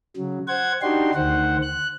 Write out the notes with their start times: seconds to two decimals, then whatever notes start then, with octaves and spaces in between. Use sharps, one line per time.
0.17 C#3 F#3
0.48 C5 F#5 G#6
0.82 D4 D#4 F#4 G4 C6
1.15 D2 D#3 C5 F#5
1.63 F#6